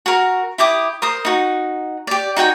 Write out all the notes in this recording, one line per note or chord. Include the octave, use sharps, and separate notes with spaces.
F#4 A#4
E4 G4 D6 D#6
A#4 C5 D#6
D#4 F#4
G4 D5
D#4 F#4 G5 G#5